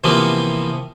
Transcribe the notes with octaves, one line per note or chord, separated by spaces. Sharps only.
C3 E3 F3 G3 A#3 B3